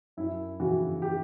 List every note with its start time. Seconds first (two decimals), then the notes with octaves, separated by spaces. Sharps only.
0.17 F#2 E4
0.60 C#3 E3 F#4
1.02 G4